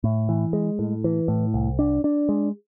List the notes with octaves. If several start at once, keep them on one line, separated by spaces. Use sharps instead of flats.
A2
E3
G#3
A2
E3
A2
C2
D4
D4
G#3